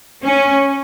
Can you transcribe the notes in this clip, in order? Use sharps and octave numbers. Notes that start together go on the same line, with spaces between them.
C#4